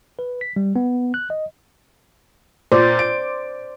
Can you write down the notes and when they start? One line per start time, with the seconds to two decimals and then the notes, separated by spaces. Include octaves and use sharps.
0.19 B4
0.41 B6
0.56 G3
0.76 B3
1.14 F#6
1.30 D#5
2.72 A#2 C5 D5
2.99 D7